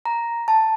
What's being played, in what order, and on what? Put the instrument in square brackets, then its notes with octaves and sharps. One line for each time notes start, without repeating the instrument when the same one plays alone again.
[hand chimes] A#5
A5